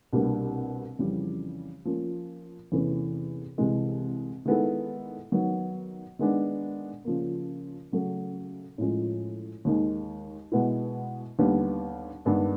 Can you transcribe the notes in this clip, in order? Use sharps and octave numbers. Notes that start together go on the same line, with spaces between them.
C2 B2 G3 A#3 D4
F2 C#3 E3 G3
F3 A#3 C#4
E2 C3 E3 A3 C#4
C2 C3 E3 G#3
D#3 G#3 B3 E4 A4
D#3 F#3 B3
D#3 G#3 B3 D4
C#3 F3 A#3
C#3 F#3 A3
A2 F3 G#3 C#4 F4
D#2 D#3 G#3
B2 G#3 B3 E4
D#2 D3 G3 B3
G2 D#3 G#3 B3 D4